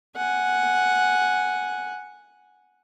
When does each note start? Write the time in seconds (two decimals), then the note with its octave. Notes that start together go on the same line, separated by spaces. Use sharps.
0.16 F#5 G#5